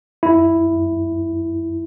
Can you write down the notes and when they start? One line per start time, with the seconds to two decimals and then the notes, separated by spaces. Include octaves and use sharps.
0.23 E4